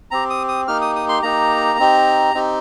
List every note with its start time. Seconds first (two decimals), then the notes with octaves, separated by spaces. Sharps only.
0.11 C4 G4 A#5
0.30 D#6
0.48 D#6
0.67 A#3 D#4 G4 F6
0.82 D#6
0.96 D#6
1.09 C6
1.22 A#3 D#4 G4 A#5
1.79 C4 D#4 G4
2.34 C4 D#4 G4